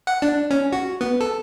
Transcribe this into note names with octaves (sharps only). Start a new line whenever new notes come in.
F#5
D4
C#4
F#4
B3
A4